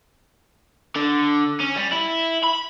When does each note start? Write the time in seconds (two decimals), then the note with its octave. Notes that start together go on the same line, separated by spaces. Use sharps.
0.96 D3
1.60 C#4
1.77 G3
1.93 E4
2.44 B5